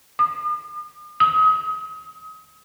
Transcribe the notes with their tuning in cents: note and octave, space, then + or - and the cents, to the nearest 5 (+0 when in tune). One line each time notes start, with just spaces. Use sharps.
D#6 -45
D#6 +35